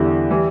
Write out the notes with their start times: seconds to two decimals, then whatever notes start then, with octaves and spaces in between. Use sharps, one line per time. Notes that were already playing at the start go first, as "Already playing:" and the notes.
Already playing: E2 D3 G3 E4
0.31 E3 G3